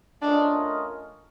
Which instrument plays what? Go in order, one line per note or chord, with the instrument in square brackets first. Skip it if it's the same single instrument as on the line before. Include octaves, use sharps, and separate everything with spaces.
[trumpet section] A3 C#4 F4 A#4 D#5 [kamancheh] D4